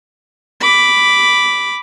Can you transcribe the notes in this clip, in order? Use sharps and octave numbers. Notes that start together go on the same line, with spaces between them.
B5 D6